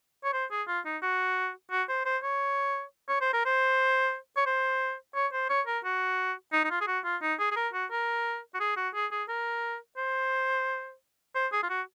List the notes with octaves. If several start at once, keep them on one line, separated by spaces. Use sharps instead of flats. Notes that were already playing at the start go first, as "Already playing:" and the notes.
C#5
C5
G#4
F4
D#4
F#4
F#4
C5
C5
C#5
C#5
C5
A#4
C5
C#5
C5
C#5
C5
C#5
A#4
F#4
D#4
D#4
F4
G#4
F#4
F4
D#4
G#4
G#4
A#4
F#4
A#4
F#4
G#4
F#4
G#4
G#4
A#4
C5
C5
G#4
F4
F#4